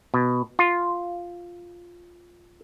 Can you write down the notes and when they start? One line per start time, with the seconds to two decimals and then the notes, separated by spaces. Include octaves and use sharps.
0.14 B2
0.59 F4